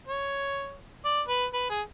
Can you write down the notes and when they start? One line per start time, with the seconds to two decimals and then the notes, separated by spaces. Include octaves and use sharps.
0.07 C#5
1.05 D5
1.28 B4
1.53 B4
1.70 G#4